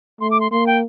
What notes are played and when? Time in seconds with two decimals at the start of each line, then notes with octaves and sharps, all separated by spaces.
0.21 A3 C6
0.31 D6
0.40 C6
0.51 A#3 C6
0.67 G5